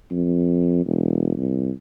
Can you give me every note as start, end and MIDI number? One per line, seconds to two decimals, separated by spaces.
0.11 0.81 41
0.86 1.36 28
1.37 1.70 36